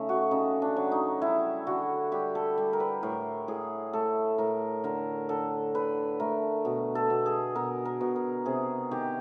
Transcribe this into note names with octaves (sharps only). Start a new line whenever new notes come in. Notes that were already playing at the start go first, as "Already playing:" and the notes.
Already playing: C#3 A3 D#4
F#4
C#3 D#4
D4
F#3
D#4
G3 E4
D3 F#4
G3 G4
A4
G3
A#4
B4
A2 A#4
A2 G#4
A3 A4
A2 A#4
D3 A#4
D3 A4
D3 B4
A3 A#4
B2
A4
B2
G#4
B2 A#4
A#4
B2
A#4
C3 G#4
D#3 G4